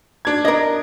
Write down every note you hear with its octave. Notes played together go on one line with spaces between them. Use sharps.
D4 G#6
A#4 D#5